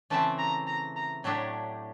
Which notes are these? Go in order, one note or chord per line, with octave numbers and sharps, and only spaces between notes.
C#3 E3 A3 C4 A5
A#5
A#5
A#5
A2 F#3 A3 D4 G4 A5